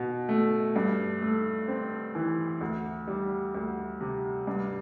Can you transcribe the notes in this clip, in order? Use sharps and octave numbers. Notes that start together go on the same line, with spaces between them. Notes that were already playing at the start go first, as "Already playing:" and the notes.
Already playing: B2
A3
G2
A3
C4
E3
D2
G3
D2
C3
G2